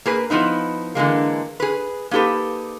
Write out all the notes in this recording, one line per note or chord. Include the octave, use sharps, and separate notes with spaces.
A#3 G#4 B4
F3 B3 D#4 E4
D3 E3 G#3 A#3
G#4 B4
A#3 D#4 G4 A4 B4